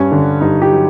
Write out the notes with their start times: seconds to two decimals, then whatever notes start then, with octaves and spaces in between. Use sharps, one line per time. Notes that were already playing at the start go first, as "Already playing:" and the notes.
Already playing: G2 C#4
0.12 D3
0.41 G2 D#4
0.62 G4
0.72 F#3